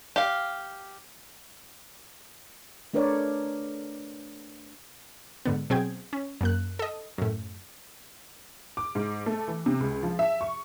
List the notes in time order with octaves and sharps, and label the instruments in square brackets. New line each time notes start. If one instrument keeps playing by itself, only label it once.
[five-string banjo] G4 F5
[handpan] A3 D4 A#4 B4 C#5 D5
[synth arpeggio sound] G#2 D3 B3
B2 F#3 C4 G#4 G5 G#6
C#4
F#2 A#3 F#6
A4 D#5
F#2 A2
[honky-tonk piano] D6
G#2
A3
E3
C3
C#2
F3
E5
C#6